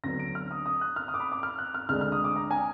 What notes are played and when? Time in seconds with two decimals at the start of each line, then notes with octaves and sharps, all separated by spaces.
0.04 D2 D3 F#3 B3 A#6
0.19 D7
0.35 F6
0.51 D#6
0.66 D#6
0.81 F#6
0.96 F6
1.08 D#6
1.14 D6
1.20 B5
1.32 D6
1.43 F6
1.58 F#6
1.74 F6
1.89 D2 D3 G#3 D4 F6
2.01 F6
2.12 D#6
2.24 D6
2.36 A#5
2.51 G#5